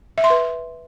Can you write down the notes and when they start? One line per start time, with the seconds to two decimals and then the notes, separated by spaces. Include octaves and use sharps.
0.18 E5
0.24 C6
0.30 B4